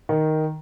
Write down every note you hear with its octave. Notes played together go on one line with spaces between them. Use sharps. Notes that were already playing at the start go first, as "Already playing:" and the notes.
D#3